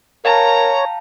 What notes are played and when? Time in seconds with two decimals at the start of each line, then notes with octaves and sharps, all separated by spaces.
0.25 A#4 C#5 F5 G5 A5 A#5